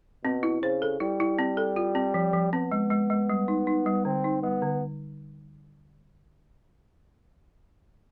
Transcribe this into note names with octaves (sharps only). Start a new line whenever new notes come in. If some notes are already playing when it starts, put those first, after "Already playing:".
B2 C4
E4
C#3 C5
A4
G3 E4
E4
C4
A4
F4
C4
F3
F3
B3 C4
G#3
G#3
G#3
G3
D#4
D#4
G3
D3 C4
D#4
G3 B3
D3